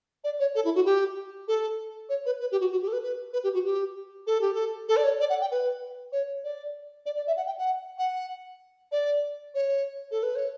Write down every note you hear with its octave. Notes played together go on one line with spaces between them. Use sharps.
D5
C#5
A4
E4
F#4
G4
A4
C#5
B4
B4
G4
F#4
F#4
G4
A4
B4
B4
B4
G4
F#4
G4
A4
G4
A4
A4
D5
C#5
D5
F#5
G5
B4
C#5
D5
D5
D5
E5
F#5
G5
F#5
F#5
D5
C#5
A4
B4
C#5